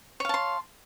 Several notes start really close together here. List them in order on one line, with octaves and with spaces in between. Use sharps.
C#5 F5 A5 C6